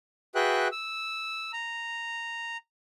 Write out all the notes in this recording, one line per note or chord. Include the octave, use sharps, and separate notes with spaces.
F#4 G#4 B4 E5 G5 F#6
E6
A#5